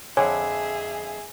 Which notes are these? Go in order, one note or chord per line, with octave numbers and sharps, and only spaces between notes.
F2 D3 G#4 C#5 E5 G#5